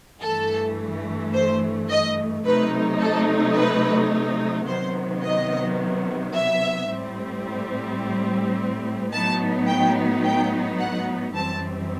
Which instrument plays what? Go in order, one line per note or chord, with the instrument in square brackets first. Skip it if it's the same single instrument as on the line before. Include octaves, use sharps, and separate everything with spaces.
[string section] G2 E3 A3 A4
C5
D#5
C3 F#3 A3 D#4 B4
A4
B4
C3 D#3 F#3 B3 C5
D#5
E5
A2 G3 C4
A2 F#3 B3 D#4 A5
G5
G5
F#5
F#2 E3 G3 C4 A5